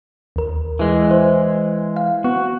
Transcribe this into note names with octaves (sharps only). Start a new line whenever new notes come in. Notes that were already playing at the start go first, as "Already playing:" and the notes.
D#2 A#4
E3 G#3
C5
F5
B3 F#4